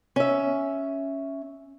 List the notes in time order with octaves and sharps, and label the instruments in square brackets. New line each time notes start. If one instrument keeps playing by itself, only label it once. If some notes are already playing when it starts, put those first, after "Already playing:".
[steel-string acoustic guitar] C#4 E5